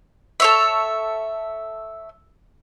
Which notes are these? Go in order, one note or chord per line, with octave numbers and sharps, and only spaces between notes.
A4 C#5 E5